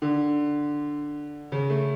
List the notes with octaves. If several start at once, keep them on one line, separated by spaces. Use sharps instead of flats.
D3
C#3
A3